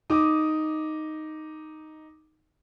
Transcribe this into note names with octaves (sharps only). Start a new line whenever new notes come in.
D#4 D6 D#6